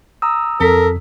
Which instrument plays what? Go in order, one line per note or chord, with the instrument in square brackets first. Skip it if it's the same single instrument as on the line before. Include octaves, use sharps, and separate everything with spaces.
[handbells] A#5 D#6 E6
[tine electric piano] F2 B6 [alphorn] A4 [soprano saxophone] A#4